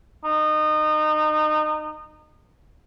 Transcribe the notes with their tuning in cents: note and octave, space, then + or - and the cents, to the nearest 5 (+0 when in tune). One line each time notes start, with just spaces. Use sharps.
D#4 -25